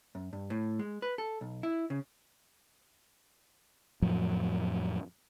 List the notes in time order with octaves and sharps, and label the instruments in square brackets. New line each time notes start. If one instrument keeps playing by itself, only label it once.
[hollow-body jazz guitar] F#2
G2
A2
G#3
B4
A4
B1
E4
C#3
[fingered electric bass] F2 A2 F3 F#3